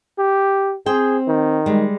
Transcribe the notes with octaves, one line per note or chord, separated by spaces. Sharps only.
G4
C4 G#4 C5 G5
D#3
G3 G#3